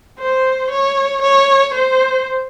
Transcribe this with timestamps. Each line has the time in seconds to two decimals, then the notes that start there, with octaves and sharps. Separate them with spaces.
0.19 C5
0.71 C#5
1.22 C#5
1.74 C5